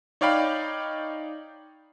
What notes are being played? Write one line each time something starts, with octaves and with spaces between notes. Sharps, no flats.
D#4 C#5 D5 F5 G5 B5